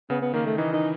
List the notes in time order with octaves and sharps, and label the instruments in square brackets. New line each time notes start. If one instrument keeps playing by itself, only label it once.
[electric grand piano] C#3 [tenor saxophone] B3
[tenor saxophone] B3
[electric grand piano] D#3 [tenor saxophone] A#3
[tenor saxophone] A3
[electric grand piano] E3 [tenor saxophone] D#4
[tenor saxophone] D#4